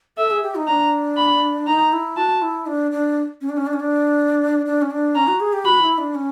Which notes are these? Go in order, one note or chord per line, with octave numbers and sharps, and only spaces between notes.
A4 E5
G#4
G4
D#4
D4 A#5
B5
D#4 A#5
E4
F#4 A5
E4
D4
D4
C#4
D4
C#4
D4
C#4
D4
D4
C#4
D4
C#4 A#5
F#4
G#4
G4
F#4 B5
E4
D4
C#4